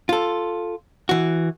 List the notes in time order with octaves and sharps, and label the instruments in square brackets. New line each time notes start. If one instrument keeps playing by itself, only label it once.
[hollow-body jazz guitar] F4 A4
E3 F#4